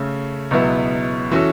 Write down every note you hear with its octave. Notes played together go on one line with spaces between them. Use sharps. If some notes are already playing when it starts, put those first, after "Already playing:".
Already playing: C#3 A3 C#4 A4
C#2 B2 F#3 B3 E4
E3 C#4 F#4 A4